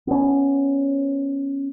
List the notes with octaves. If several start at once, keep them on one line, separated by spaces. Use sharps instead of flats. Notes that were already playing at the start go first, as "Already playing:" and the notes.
B3 C#4